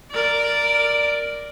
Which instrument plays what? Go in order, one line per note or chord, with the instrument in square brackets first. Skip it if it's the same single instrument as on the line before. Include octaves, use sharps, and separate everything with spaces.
[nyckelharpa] A#4 D5